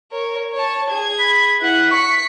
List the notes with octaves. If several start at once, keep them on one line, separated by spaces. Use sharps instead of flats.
A#4 C#5
C#5 A5
G#4 G#6
B5
E4 B4 F#5
C#6 B6 C#7